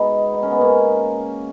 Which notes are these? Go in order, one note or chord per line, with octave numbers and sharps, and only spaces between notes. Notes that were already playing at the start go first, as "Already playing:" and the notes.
Already playing: B2 G#3 B3 D#4
D#4
C#4
B3
A#3 C#4